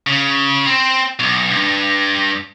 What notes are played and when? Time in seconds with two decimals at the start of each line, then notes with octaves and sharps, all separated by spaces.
0.07 C#3
0.66 C4
1.19 B1
1.51 G2